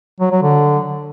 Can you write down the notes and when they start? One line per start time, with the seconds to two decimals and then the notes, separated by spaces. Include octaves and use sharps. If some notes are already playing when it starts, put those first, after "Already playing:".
0.20 F#3
0.31 F#3
0.42 D3